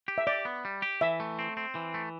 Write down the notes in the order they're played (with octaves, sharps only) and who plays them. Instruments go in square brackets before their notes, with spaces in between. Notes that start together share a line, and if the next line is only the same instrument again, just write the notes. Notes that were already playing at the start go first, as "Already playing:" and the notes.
[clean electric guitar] G4
[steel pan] E5
[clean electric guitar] G4 [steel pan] D5
[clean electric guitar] B3
G3
G4
[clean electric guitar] E3 [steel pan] E5
[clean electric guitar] A3
C4
C4
E3
A3